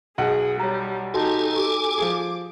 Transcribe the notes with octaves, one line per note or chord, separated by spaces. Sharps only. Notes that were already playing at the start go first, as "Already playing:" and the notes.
B1 G#4 F#5
G3 C#5 A#5
D#4 F#4 G4 A4 G#5 A5
G4 D6
F3 G#4